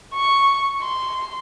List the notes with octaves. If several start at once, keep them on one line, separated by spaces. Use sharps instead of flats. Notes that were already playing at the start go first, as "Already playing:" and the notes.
C#6
C6